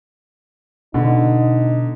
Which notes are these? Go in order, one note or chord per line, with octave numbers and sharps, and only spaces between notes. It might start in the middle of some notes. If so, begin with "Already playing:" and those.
B2 D3 D#4